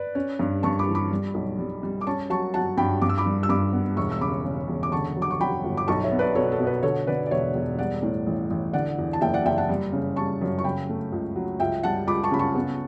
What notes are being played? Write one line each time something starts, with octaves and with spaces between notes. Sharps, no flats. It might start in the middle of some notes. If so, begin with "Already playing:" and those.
Already playing: B4 D5
C#4
G2
G2 A5 C#6
B5 D6
E3
B5 D6
G3
B1
G3
G3
D6
C#4 A5 C#6
F#3 A5 C#6
F#3 F#5 A5
G2 G5 B5
G2 D6
E6
B5 D6
G3
E6
G2 B5 D6
B3
E1 C#6 E6
E6
C#3 B5 D6
C#3
E1
D6
D3 A5 C#6
F#3
D6
C#6
F#3 G5 B5
G1
D6
B1 A5 C#6
C#5 E5
B3
B4 D5
B2 A4 C#5
A4
B2
B4
D3 A4 C#5
D3 B4 D5
D5
E1 C#5 E5
E1
G3 D5 F#5
A2
A1
A1
D3 D5 F#5
E2
A5
F#1 E5 G5
D5 F#5
F#1 E5 G5
F#5 A5
G3
C#3
G3 A5 C#6
F#2
C#6
C#3 G5 B5
A3
C#2
F#3
C#2 E5 G5
G3 F#5 A5
C#2 B5 D6
A5 C#6
C#3 B5
A5 C#6
B3